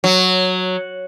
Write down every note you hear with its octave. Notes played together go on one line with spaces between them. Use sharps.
F#3